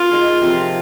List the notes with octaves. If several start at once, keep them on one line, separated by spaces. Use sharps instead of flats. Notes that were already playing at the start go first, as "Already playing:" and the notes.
Already playing: C4 F4 A#4
A#3 D#4 G#4
C3 F3 C4